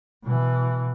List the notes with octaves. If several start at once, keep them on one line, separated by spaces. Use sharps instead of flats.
B2 E3